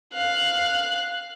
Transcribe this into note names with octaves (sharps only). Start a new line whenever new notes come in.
F5 F#6